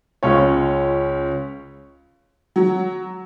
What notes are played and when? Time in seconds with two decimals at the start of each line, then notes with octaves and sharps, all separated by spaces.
0.23 C#2 C#4 F4 C#5
2.56 F#3